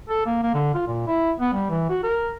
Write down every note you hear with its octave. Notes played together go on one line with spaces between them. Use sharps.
A4
A#3
A#3
D3
F4
A#2
E4
B3
G3
E3
F#4
A#4